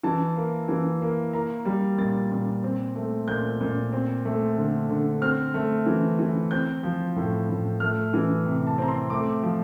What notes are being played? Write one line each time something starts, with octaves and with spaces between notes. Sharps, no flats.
E3 A5
A#3
E3
A#3
A#3 A#5
G3
A#2 A6
A#2
C4
A3
A#2 G6
A#2
C4
A3
D3
D3
C4 F6
A3
E3
E3
C4 G6
F3
A2
A2
A3 F6
E3
C3
A5
C4 A#5
C6
A3 D6
F3